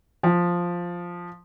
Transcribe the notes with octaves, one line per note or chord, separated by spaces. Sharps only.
F3